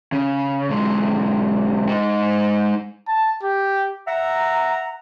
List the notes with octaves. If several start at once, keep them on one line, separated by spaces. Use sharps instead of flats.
C#3
B1 G#3
G#3 D#4
A5
G4
E5 F#5 A#5